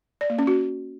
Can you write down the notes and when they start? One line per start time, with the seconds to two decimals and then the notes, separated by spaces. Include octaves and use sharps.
0.21 D5
0.30 A#3
0.39 C#4
0.47 F#4